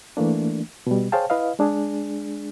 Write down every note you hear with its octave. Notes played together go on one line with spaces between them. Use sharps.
E3 A3 A#3 D4
B2 G3
G#4 C5 C#5 F5 G5 A5
E4 B4 D#5 F5
G#3 D4 G#4